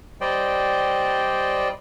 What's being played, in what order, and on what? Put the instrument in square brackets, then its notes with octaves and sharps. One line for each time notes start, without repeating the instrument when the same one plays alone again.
[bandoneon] G3 C5 D5 D#5 G5